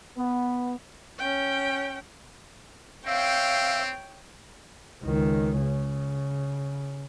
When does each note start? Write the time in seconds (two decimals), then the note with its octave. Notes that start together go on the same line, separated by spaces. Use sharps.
0.17 B3
1.18 C#4 G5
3.07 C4 C#5 E5 F5 G5
5.04 C#2 D#3
5.60 C#3